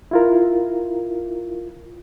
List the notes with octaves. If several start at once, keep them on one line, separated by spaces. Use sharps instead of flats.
E4 F4 A#4